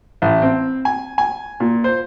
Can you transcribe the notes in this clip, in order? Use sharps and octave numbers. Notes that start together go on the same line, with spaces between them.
A1
C4
G#5
G#5
A#2
C5